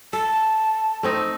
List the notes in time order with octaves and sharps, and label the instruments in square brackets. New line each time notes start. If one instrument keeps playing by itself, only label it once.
[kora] A4 [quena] A5
[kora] A3 C4 D#4